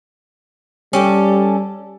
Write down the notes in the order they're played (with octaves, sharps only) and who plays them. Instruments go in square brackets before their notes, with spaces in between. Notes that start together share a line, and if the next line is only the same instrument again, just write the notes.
[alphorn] G3 [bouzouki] C#4 G4 A4